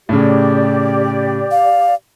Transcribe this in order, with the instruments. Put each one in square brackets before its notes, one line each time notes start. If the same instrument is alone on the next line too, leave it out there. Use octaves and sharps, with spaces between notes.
[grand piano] A2 C#3 [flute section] G4 D5
[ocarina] F5